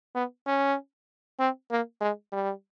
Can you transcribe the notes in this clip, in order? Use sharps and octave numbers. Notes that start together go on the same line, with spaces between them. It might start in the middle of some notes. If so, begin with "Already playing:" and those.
B3
C#4
C4
A#3
G#3
G3